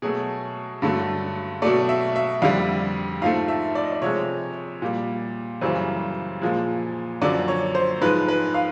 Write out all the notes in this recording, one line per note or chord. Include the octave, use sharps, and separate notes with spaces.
B2 F#3 A3 G#4
G2 D3 F#3 A3
B2 F#3 A3 D5
E5
E5
F2 D3 G3 F5
G#2 F3 A3 F5
E5
D5
D#5
D5
C3 F3 G#3 C#5
A#2 G3
F#2 C#3 E3 G3 C5
A#2 F3 G#3
F#2 D3 F3 D5
C#5
C5
G#2 F3 G#3 B4
B4
F5